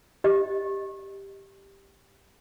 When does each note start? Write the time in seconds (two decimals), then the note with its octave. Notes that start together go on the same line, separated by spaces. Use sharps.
0.24 G4 D#5